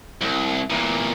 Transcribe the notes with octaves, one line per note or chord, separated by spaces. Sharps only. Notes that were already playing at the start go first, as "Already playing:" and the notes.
C2
E2 A#2